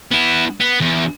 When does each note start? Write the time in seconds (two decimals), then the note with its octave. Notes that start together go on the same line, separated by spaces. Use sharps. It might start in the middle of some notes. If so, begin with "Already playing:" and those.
0.11 B3 E4
0.60 B3
0.81 E2